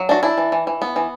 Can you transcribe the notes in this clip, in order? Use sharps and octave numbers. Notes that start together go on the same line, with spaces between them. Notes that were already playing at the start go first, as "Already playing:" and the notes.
Already playing: F#3
D4 F#4
D4 E4
E3
E3
E3
B3
E3